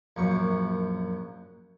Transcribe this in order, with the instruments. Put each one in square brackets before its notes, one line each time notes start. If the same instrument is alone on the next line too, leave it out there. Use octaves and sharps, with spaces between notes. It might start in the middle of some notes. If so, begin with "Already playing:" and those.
[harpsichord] A#1 F#2 C#6